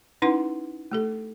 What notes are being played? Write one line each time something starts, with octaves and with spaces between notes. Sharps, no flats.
C#4 D#4 E4 B4 F#5 C6
A3 G4 A4